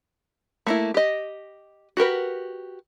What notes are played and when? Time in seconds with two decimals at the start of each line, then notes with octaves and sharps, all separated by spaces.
0.67 A3 A#3 E4
0.94 G4 D#5
1.97 F#4 G4 A#4 B4